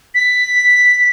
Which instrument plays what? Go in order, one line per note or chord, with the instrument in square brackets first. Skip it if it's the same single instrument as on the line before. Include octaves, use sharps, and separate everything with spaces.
[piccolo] B6